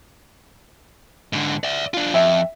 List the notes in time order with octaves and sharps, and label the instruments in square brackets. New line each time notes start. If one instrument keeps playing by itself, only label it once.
[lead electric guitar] G#2 D3
D5 E5
D4 F4
[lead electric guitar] F2 [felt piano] E5